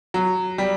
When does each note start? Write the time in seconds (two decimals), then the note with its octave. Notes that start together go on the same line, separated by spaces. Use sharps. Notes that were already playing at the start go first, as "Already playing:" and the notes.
0.14 F#3
0.58 G3